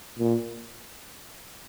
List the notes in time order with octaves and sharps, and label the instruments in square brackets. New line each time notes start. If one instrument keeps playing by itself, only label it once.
[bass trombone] A#2